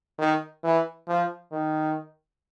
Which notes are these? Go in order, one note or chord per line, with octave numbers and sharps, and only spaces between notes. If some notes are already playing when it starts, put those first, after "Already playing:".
D#3
E3
F3
D#3